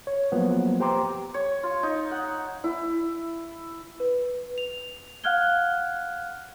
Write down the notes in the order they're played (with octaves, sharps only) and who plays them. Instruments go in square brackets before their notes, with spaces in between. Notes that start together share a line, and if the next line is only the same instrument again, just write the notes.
[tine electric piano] C#5
F3 F#3 A#3 B3
G4 C5 G5 A#5 C6 D6
[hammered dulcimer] C#5
F4
D#4
F#5
[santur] E4
[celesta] B4
F7
F5 F#5 F6 F#6 G#6 G7